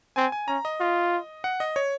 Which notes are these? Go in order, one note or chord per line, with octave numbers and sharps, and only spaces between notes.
C4 G#5
G#5
C#4 A#5
D#5
F4
F#5
D#5
C#5